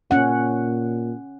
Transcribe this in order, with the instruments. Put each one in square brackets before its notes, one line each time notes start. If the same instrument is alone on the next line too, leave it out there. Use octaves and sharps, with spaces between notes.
[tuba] A#2 [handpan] C#4 F#5